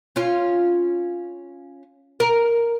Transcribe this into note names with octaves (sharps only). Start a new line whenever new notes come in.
C#4 F4
A#4